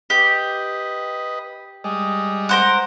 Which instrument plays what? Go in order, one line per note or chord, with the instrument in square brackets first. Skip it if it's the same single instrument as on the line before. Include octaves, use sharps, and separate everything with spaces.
[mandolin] G4 [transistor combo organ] B4 D#5
[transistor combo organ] G3 G#3 D#5
[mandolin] A#4 C5 F#5